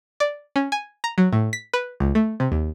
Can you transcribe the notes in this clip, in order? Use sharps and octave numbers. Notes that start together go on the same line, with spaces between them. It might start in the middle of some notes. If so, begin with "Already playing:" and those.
D5
C#4
G#5
A#5
F#3
A2
B6
B4
C#2
A3
C3
D#2